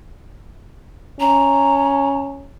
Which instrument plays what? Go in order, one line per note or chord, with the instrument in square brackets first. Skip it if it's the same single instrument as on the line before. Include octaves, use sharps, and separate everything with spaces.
[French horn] C#4 [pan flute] A#5